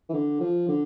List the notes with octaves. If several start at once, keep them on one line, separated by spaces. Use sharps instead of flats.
E3
D3
F3
D3